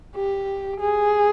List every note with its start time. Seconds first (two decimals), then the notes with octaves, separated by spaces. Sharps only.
0.16 G4
0.80 G#4